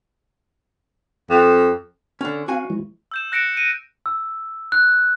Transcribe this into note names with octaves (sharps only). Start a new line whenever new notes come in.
F2
D3 C#4
C4 F#4 F5 G#5
F3 G#3 E4
E6 G6 E7
F#6 A#6 C#7 D7 E7
D#7
E6
F#6